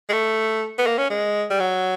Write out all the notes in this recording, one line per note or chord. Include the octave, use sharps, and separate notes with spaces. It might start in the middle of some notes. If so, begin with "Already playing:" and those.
G#3
A3
B3
A#3
C#4
G#3
G3
F#3